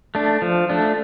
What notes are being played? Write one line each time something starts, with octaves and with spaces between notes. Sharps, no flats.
A3 D4
F3
A3 D4